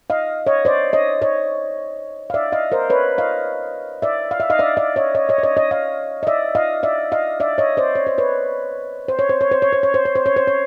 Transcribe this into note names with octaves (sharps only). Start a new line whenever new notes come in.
D#5 F5
C#5 D#5
C5 D5
C#5 D#5
C#5 D#5
F5
D5 E5
D#5 F5
A#4 C5
B4 C#5
D#5 F5
D5 E5
F5
E5
D#5 F5
D5 E5
D5 E5
C#5 D#5
C#5 D#5
C#5 D#5
D5
C#5 D#5
C#5 D#5
D#5 F5
D#5
D5 E5
D#5 F5
D5 E5
D#5 F5
D5 E5
C#5 D#5
C5 D5
C#5
C5
B4 C#5
C5
C#5
C5
C#5
C5
C#5
C5
C#5
C5
C#5
C5
C#5
C5
C#5